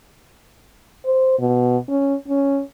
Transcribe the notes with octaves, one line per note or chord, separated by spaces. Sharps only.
C5
B2
C#4
C#4